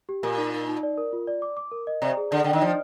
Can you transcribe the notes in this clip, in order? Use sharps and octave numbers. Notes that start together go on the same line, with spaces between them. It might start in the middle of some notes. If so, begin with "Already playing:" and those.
G4
A#2 A#4
D#4
D#4
D#4
D5
A#4
F4
D5
D6
D6
A#4
D#5
C3 D5
G#4
D3 D5
D3 G5
D#3
F3 D5